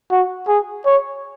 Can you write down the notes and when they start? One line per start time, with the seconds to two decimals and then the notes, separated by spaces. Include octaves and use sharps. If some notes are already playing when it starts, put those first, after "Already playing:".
0.11 F#4
0.48 G#4
0.85 C#5